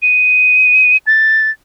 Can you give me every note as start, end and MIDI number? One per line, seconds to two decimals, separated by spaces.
0.02 0.97 99
1.07 1.50 93